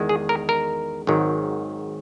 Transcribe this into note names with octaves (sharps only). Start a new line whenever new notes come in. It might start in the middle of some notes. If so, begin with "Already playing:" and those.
Already playing: E2 D#3 G#3
G#4
A#4
A#4
G#1 G#2 D#3 F#3